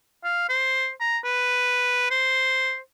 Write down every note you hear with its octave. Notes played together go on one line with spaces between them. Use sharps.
F5
C5
A#5
B4
C5